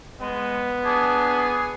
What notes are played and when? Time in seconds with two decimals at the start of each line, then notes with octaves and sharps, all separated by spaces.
0.20 G#3 B3
0.85 D4 G#4